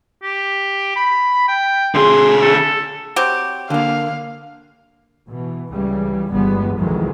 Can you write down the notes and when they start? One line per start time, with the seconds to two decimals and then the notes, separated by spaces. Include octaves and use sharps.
0.23 G4
0.96 B5
1.48 G5
1.95 D3 G#4 C6
2.41 A4
3.16 F#3 C4 G4
3.70 D3 A#3 F5
5.29 B2 E3
5.72 C#2 C#3 E3 G3
6.30 G1 E2 G3 G#3 B3
6.79 C2 F2 D#3 E3 F#3 G#3